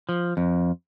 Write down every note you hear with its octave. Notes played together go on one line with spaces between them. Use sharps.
F3
F2